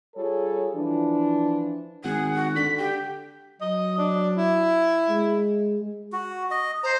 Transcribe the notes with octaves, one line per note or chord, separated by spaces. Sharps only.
G3 F4 G#4 A4 C#5
E3 F3 D4
G#1 G#4 F#5
F#4
D3 B6
G4 G5
F#3 D#5
D4
E4
G#3
F#4
D#5
C5 A#5